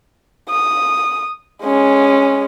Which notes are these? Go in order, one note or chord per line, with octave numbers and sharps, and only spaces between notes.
D#6
G#3 C#4